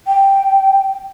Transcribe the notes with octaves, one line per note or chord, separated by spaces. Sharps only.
G5